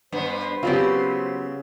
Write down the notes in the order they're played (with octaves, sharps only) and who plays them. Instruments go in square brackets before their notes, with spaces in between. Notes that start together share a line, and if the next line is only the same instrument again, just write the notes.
[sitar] G2 B3 [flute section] B4 C5
[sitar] C#3 [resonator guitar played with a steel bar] F#3 B3 C4 [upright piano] F4 G4